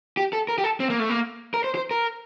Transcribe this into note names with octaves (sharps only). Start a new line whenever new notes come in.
G4
A4
A#4
G4
A4
C4
A#3
A3
A#3
A#4
C5
C5
A#4